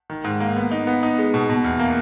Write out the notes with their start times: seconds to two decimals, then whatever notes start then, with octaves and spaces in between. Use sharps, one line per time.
0.10 D#3
0.24 G#2
0.40 A#3
0.56 B3
0.71 D#4
0.87 B3
1.03 D#4
1.18 G#3
1.34 B2
1.50 B2
1.64 E2
1.80 A#3